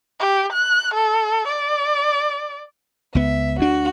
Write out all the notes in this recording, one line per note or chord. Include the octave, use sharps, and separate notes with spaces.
G4
F#6
A4
D5
C#2 B3 E5
D2 D4 F#4